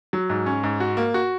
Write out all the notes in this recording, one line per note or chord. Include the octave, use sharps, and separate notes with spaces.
F#3
G#2
C#4
G#2
F#4
A#3
F#4